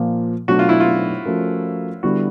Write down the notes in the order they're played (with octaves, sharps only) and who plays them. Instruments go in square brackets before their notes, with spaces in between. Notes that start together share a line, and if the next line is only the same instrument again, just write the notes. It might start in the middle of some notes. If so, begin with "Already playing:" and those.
Already playing: [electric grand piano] A#2 F3 A#3
[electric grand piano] B2 F#3 A3 D4 [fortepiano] F#4
[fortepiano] F4
E4
F4
[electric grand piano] F3 A3 C#4 F#4 A#4
[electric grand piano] D3 G3 B3 E4 [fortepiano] F#4